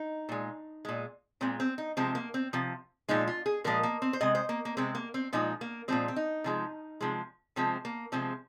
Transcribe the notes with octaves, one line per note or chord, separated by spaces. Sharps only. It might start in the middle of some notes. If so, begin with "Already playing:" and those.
Already playing: D#4
A#2 G#3
A#2 G#3
A#2 G#3 C4
C4
D#4
C3 F3 G#3 C4
A#3
C4
C3 F3
A#2 F3 G#3 D#4
F4
G#4
A#2 F3 G#3 A#4
A#3
C4
C5
C3 G#3 D#5
C5
A#3
A#3
C3 G#3 C4
A#3
C4
A#2 F3 G#3 D#4
A#3
A#2 F3 G#3 C4
C4
D#4
C3 F3 G#3
C3 F3 G#3
C3 F3 G#3 C4
A#3
C3 F3 G#3 C4